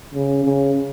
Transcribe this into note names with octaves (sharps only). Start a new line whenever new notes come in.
C#3
C#3